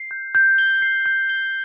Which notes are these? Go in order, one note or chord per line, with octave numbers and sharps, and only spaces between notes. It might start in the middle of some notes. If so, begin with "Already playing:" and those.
Already playing: C7
G6
G6
G7
C7
G6
G7